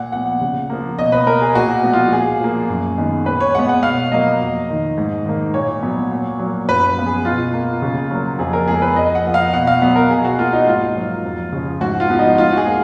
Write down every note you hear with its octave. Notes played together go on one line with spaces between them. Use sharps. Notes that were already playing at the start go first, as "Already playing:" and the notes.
Already playing: A#2 F#5
F3 B3 F#5
C#3
F3 A#3
B2 D#5
B4
A#3 A#4
G#4
A#2 F#4
F3 G#3 B3
F4
A#2 G#4
F3 A#3
F#2
D#3 G#3 B3
A#2 B4
C#5
G#3 B3 F#5
F#5
B2 F5
F#3 A#3 D#5
F2
D#3 A#3
G#2
D#3 A#3
A#2 C#5
F#3 B3
A#2
F#3 A#3
F#2 B4
B4
F3 B3
G#4
B2 F4
A#3
C#3
F#3 A#3
F2 G#4
A#4
F3 G#3 B3 G#4
A#4
B4
F2 D#5
F#5
F3 A#3
F5
B2 F#5
F5
F#3 B3
A#4
B2 G#4
F#4
A#3 F4
D#4
G#2 F4
F#3 A#3
F2
C#3 F3
G#2 F#4
F4
F3 B3
D#4
G#2 F4
F#4
G#4
F3 A#3